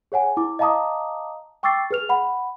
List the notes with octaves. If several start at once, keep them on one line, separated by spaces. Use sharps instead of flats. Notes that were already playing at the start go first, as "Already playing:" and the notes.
G#4 C#5 F#5 G#5
E4 D6
D#5 F5 A5 A#5 D6 D#6
G5 C#6 D6 E6 A6 C7
G#4 B4 F6 F7
F#5 B5